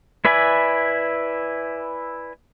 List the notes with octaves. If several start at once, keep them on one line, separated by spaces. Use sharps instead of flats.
E4 B4 D5 E5 G#5